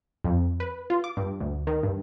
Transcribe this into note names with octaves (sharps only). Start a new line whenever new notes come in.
F2
B4
F4
D6
G2
D2
D#3
G2